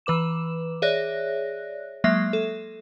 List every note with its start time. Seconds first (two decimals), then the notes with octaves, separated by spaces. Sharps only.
0.06 E3 B4 D6 E7
0.82 G#4 C#5 D5 E5 F#6 A#6
2.04 F#3 G#3 A#3 E5 A#6 C7
2.33 A4